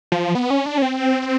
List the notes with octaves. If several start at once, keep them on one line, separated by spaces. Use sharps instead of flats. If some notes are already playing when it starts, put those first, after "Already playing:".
F3
B3
C#4
D4
C#4
C4